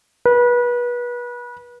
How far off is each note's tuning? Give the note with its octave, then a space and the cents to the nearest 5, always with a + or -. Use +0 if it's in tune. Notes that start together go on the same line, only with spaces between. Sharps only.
B4 -30